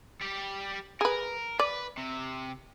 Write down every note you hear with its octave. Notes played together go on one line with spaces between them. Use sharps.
G3 G4
G#4 A#4 B4
B4 D5
C3